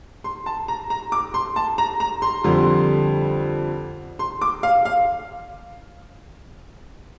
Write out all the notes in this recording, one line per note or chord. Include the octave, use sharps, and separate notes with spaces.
C6
A5
A#5
A#5
D6
C6
A5
A#5
A#5
C6
F2 D3 G3
C6
D6
F5
F5